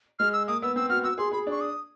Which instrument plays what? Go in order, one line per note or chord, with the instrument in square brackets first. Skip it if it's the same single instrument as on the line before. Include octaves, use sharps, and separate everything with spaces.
[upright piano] G#3 [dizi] F6
[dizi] E6
[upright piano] A#3 [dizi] D#6
[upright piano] B3 [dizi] E6
[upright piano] C4 [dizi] E6
[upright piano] F#4 [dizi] F6
[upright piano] F#4 [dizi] E6
[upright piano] G#4 [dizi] C6
[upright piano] G#4 [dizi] B5
[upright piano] D4 [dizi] C#6
[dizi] D#6